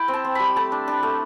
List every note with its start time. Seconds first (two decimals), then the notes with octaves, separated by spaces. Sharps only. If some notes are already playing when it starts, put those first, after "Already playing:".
Already playing: E4 G5
0.08 C4
0.13 A5
0.25 C4
0.35 G3 B5
0.56 A3 A5
0.72 D4
0.88 D4
1.03 A3